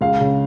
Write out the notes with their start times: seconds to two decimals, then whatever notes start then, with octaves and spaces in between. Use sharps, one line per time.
0.01 C#2 F5
0.21 C#3